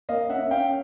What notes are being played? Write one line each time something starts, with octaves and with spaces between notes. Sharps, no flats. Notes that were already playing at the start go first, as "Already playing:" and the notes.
A#3 D#5 F5
C#4 E5 F#5
C#4 F5 G5